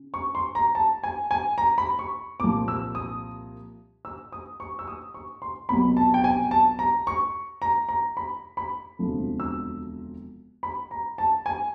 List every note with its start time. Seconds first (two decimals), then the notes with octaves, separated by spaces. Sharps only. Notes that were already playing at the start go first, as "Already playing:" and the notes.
Already playing: C#3
0.14 C#6
0.35 C6
0.55 A#5
0.75 A5
1.03 G#5
1.31 G#5
1.58 A#5
1.78 B5
1.99 C#6
2.40 C2 A#2 F3 D6
2.68 E6
2.95 D#6
4.05 E6
4.32 D#6
4.60 C#6
4.79 E6
4.88 D#6
5.14 C#6
5.42 C6
5.69 C2 B2 F#3 B5
5.97 A5
6.14 G5
6.24 G#5
6.51 A5
6.79 A#5
7.07 C#6
7.62 A#5
7.89 A#5
8.17 B5
8.57 B5
8.99 E1 D2 C3 F3
9.40 E6
10.63 B5
10.91 A#5
11.18 A5
11.46 G#5